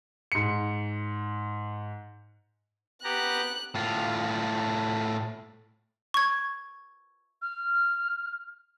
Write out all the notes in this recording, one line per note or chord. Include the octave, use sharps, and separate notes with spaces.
G#2 C#7
B3 G4 A#5 F#6
A2 F4
C#6 G#6
F6